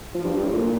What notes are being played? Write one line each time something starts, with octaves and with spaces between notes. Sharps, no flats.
F3
G2
G2
A2
A#2